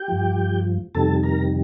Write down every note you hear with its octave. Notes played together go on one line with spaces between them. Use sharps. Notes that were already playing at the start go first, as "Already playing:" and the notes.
Already playing: G4 G5
G2 F3
F2 C3 D#3 G3 A4 A5
A#4 A#5